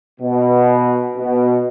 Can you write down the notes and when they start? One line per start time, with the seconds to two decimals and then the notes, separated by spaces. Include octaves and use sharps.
0.21 B2
1.16 B2